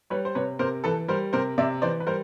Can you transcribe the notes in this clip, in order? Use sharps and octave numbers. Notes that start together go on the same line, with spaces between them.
G3 B4 C#5
C5
C3 B4 C#5
C3 A#4 C5
E3 A4 B4
G3 A#4 C5
C3 A#4 C5
C3 D5 E5
E3 C5 D5
B4
G3 A#4 C5